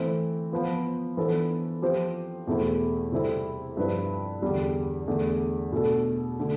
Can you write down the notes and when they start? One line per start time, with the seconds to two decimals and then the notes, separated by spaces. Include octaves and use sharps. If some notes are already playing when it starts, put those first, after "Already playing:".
Already playing: E3 A3 C4
0.52 F3 B3 F4
1.17 E3 B3 D4 A4 C5
1.82 F3 C4 G4 C5
2.47 E2 B2 A3 C4 E4
3.12 C3 G3 C4 E4 A4
3.77 G2 F3 C4 E4 B4
4.42 E2 D3 G3
5.07 E2 D3 A3
5.72 B2 A3 D4 A4
6.40 D3 A3